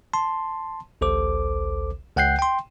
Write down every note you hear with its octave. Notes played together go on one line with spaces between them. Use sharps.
A5 C6
A1 D2 A4 C5 D6
C#2 F#5 G5 F#6 G6 C7
G5 C6